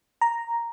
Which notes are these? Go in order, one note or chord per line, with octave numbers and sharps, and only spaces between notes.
A#5